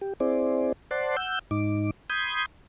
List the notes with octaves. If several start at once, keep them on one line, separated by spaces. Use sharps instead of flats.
G4
C4 E4 G#4 C5 D5
C5 D5 F#5 A5 C6
F#5 E6 G6
G#2 D#4 D6
B5 C6 D#6 G6 G#6